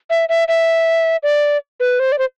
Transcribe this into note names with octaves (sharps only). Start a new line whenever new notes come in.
E5
E5
E5
D5
B4
C5
D5
C5